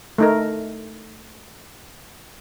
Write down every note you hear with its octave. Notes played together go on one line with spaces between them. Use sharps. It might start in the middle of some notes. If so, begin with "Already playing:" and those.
A3 D#4 A#4